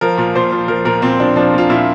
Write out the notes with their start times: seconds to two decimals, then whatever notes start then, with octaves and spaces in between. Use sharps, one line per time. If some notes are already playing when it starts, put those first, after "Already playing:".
0.01 F3 A#4
0.17 A#2
0.35 A#2 C5
0.52 F3
0.68 F3 A#4
0.85 A#2 A#4
1.02 A#2 C4
1.20 F3 D4
1.36 F3 D4
1.54 A#2 F4
1.69 A#2 E4